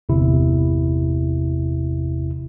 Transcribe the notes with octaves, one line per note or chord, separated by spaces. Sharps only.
G1 E2 C3 E4